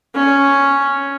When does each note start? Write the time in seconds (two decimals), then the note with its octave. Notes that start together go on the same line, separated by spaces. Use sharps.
0.15 C#4